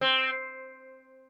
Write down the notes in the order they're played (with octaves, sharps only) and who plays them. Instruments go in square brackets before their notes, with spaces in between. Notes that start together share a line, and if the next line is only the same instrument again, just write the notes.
[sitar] C4